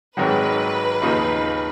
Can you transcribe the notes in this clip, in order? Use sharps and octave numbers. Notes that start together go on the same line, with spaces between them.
G#1 G#2 D#3 F#3 B4
D#2 C#3 F3 A#3 D#4